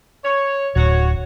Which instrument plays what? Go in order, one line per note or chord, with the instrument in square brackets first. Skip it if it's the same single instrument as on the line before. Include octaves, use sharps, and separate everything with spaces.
[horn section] C#5
[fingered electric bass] D1 [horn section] F#4 C#5